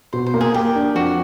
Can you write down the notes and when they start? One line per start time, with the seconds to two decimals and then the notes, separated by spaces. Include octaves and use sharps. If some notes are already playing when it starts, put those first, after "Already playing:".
0.13 B2 C5
0.26 C5
0.34 A#3
0.41 G#4
0.54 A#3 G4
0.75 D4
0.95 F2 F#4